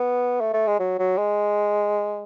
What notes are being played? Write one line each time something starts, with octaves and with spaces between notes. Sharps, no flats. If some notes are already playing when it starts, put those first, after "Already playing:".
Already playing: B3
A3
A3
G#3
F#3
F#3
G#3